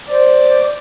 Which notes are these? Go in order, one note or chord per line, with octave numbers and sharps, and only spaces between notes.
C5 D5